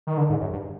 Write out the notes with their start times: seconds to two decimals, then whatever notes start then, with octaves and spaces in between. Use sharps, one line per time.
0.07 D#3
0.18 D3
0.30 G#2
0.41 F#2
0.53 G2